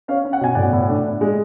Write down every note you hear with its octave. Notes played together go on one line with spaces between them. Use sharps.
C#4 C#5 F5
C#4
F#5
B2 G#5
A2 D5 F#5
A2
D4
D4
G#3